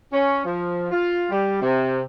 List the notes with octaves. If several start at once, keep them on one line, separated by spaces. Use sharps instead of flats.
C#4
F3
F4
G3
C3